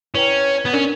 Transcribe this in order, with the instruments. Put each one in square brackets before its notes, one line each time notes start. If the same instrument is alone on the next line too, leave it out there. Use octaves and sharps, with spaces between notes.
[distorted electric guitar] C#4 [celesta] E4 B4 D5 G5 A#5
[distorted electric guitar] B3
[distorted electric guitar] C#4 [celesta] D4 A#4 D5